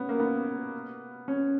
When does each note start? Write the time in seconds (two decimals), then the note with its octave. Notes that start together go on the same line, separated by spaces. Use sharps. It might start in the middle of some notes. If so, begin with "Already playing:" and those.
Already playing: B3 C#4
0.09 A#3
0.20 B3
1.28 C#4